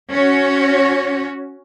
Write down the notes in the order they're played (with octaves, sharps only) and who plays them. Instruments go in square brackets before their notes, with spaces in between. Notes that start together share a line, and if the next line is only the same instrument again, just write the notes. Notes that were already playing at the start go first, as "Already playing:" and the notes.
[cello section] C#4 F#4 C#5